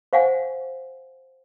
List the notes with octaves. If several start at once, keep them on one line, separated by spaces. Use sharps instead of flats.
C5 F5 F#5 G#5